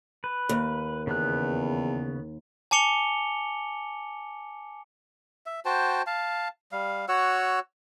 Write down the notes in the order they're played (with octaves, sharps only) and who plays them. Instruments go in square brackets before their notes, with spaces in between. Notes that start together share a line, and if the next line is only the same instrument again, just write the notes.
[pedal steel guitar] B4
[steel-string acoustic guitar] D#2
[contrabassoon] E2 [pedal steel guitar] C#3 B3 F#6
[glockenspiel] G#5 A5 D6 C#7 F7 G7
[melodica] E5
F#4 C5 G5 A5
F5 A5
G3 F5
F#4 C#5 F#5 E6